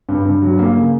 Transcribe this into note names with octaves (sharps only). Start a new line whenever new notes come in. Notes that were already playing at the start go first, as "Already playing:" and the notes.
G2
G2
F#3
A#3
C#3